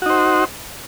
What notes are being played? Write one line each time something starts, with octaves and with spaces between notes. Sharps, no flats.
D#4 F#4 C5